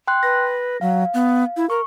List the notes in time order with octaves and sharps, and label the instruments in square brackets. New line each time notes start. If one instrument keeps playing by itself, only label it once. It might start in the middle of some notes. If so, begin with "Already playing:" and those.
[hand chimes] G5 C6 F#6
[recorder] B4 [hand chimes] A#6
[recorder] F#3 [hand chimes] F5
[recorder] B3
E4
[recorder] A#4 [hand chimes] C#6